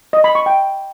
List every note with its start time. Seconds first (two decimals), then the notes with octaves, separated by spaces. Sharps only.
0.13 D#5
0.24 B5
0.35 C#6
0.46 G5